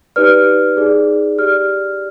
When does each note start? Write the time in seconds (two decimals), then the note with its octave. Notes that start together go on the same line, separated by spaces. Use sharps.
0.16 D#4 G4 B4 D5 F6
0.77 D#4 G#4 D5
1.38 G4 D5 F6